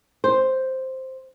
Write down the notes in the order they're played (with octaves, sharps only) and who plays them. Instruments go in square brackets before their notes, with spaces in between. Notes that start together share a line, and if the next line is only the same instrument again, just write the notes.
[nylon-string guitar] C5